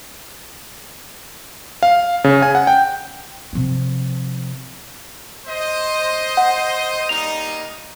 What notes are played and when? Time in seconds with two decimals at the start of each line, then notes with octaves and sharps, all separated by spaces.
1.83 F5
2.24 C#3
2.42 G#5
2.55 F#5
2.67 G5
3.53 C3 F3
5.47 C5 D#5
6.37 F#5
7.09 G3 A#3 D#4 F7